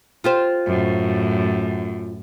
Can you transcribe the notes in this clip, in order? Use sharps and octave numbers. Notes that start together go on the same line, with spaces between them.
F4 G4 C5
F#2 A2